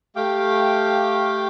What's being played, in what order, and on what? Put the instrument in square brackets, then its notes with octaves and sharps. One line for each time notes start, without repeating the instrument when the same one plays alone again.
[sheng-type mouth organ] A3 G4 F5 G5 D6